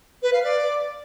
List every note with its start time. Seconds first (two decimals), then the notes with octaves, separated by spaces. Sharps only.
0.22 B4
0.33 F5
0.43 D5